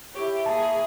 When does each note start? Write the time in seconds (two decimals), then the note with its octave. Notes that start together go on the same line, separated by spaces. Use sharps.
0.14 E4 G4 C#5
0.46 A#3 G#4 A5